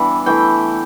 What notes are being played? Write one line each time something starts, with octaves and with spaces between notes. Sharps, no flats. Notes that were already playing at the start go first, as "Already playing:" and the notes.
Already playing: E3 G3 B3 D4 E4
E3 A3 E4 G5